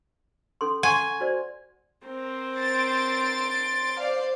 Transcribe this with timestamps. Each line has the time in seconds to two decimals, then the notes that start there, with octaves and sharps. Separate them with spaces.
0.61 C#4 A4 C6
0.83 F#5 G#5 C6 C#6
1.20 F#4 C5 D5
2.05 C4 A#4 C5
2.57 C6 A6 D7
4.00 C5 D5 F5